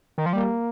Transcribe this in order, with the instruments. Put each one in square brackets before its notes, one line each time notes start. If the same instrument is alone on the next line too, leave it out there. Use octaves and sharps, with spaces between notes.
[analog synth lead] D#3
F3
[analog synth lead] G3 [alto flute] A#3